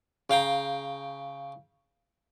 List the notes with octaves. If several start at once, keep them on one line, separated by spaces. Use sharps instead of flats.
C#3 F5 G5 A#5